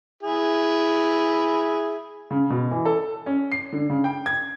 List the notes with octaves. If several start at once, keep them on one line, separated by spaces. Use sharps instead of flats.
E4 G#4
C#3
B2
E3
A4
C#4
C7
D3
C#3
G5
G#6